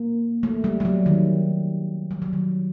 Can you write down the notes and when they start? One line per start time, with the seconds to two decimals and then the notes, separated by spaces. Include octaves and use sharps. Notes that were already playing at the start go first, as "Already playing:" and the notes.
Already playing: A#3
0.43 A3
0.64 G3
0.80 G3
0.85 F#3
1.06 D#3
2.11 G3
2.22 F#3
2.33 D#3